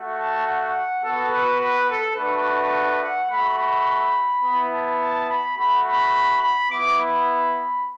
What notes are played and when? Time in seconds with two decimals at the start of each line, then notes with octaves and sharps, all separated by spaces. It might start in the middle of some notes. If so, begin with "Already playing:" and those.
Already playing: A3 F#4
0.17 A5
0.45 F#5
1.02 B3 F#4 A4
1.30 B4
1.59 B4
1.87 A4
2.15 A3 D4 F#4 B4
3.00 F#5
3.29 A3 F#4 B5
3.58 B5
4.43 B3 E4
4.70 A5
4.99 A5
5.27 B5
5.56 A3 F#4 B5
5.84 B5
6.40 B5
6.69 B3 E4 D6
6.98 B5